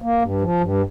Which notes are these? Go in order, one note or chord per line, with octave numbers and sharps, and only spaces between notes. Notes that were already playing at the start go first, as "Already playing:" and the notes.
A#3
G2
F3
G2